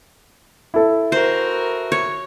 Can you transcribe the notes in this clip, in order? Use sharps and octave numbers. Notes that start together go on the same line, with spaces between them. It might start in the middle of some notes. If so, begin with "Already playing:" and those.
E4 A4
F#4 A#4 C5
C#5